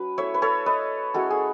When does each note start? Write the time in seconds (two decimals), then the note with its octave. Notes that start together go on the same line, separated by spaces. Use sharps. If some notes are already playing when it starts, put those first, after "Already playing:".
Already playing: F#3 C#4 B4
0.18 A3 E4 C#5 E5
0.34 B4
0.42 A4 C#5
0.66 B4 D#5
1.14 G#3 C#4 E4 F#4 A4
1.30 G#4